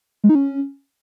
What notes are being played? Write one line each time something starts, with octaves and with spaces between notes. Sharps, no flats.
G#3
D#4
C#4